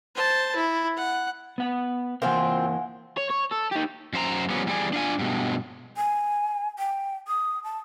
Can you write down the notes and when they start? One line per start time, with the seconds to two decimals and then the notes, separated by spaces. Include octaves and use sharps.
0.15 C5 A5
0.56 E4
0.97 F#5
1.58 B3 F#5
2.22 E3 A#3 C4 F4 A#4 F5 F#5 G#5
3.17 C#5
3.30 C#5
3.51 A4
3.71 D#4 G4
4.13 F#2 C5 A#5
4.50 F3 G3 B3 C#4
4.67 E2 G3 G#4 D5 G#5
4.93 D4 F4 G#5
5.19 G2 B2 G#3
5.97 G#5
6.79 G5
7.28 D#6
7.64 A5